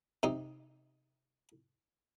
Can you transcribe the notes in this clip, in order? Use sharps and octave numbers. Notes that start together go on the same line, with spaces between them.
C3 D#4